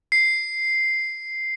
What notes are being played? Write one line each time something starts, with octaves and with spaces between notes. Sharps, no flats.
C7